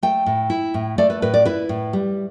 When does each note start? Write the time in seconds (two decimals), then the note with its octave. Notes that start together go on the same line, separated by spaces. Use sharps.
0.03 A3 G5
0.26 A2
0.50 E4
0.74 A2
0.98 A3 D5
1.10 B4
1.22 A2 B4
1.34 D5
1.45 E4 B4
1.69 A2
1.93 G3